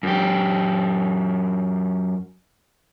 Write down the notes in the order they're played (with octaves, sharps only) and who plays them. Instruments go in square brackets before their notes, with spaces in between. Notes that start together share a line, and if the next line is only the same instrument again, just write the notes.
[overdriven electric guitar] F#2 G4